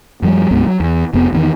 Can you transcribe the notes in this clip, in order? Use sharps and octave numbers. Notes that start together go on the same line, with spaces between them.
F#2 F3 G3
B1 F#2 G#3 B3
F#3
E2
F1 F2 B3
E2 C3 D#3